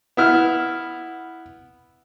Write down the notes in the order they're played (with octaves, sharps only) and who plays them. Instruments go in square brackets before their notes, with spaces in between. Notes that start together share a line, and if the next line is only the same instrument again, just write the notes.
[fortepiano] B3 E4 F6